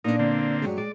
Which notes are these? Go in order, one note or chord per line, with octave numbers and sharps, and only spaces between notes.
A#2 B3 D4 D#4 A#4
D3 A#3 C4
G2 F#3 G#3
G#3 D5